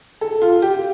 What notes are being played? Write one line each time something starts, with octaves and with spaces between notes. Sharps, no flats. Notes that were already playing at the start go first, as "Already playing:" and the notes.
A4
F4
G4